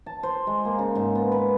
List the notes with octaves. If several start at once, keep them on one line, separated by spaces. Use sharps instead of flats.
A5
C5
G#3
A#3
C#3
G#2
B3
B4